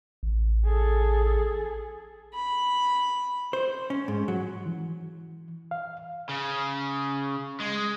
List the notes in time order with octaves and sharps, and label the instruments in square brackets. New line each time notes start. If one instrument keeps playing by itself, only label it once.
[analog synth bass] A1
[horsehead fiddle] G#4 A4
[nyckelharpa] B5
[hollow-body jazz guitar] C5
C#4
G#2
F#3
[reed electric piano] E3
F5
[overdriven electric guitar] C#3
G#3